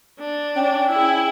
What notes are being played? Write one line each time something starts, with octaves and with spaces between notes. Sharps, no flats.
D4
C#4 G5
E4 G#4